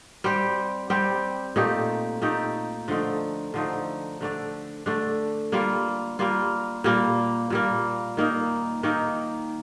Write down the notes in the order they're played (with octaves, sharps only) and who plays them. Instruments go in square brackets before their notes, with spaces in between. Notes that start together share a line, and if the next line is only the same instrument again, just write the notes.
[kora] G3 C4 G4
G3 C4 G4
A#2 A3 D#4 G4
A#2 A3 D#4 G4
D3 F3 A3 D#4
D3 F3 A3 D#4
D3 A3 D4
D3 A3 D4
G3 A#3 F4
G3 A#3 F4
A#2 G3 A#3
A#2 G3 A#3
D#3 A#3 D#4
D#3 A#3 D#4